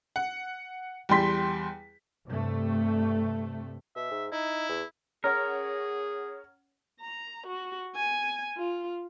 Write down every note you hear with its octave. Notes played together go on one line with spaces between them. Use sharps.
F#5
E2 G3 G5 C6 B6
G2 C3 A3
B2 E5
G#2
D#4 E4
E2
C#4 G#4 A#4 C#5 F#5
A#5
F#4
G#5
F4